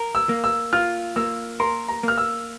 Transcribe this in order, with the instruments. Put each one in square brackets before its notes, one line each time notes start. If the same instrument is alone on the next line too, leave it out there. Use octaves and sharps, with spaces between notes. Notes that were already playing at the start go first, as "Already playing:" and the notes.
Already playing: [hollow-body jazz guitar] A#4
[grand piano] E6
[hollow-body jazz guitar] A#3
[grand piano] E6
[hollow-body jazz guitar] F4 [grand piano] F6
[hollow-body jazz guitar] A#3 [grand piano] E6
[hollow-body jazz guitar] A#4 [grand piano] C6
[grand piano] A#5
[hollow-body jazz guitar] A#3 [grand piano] F6
[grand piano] E6